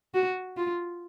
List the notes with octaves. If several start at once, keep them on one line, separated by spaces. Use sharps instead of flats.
F#4
F4